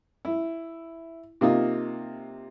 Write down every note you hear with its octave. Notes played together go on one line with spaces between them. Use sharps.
E4
C3 A#3 D#4 F4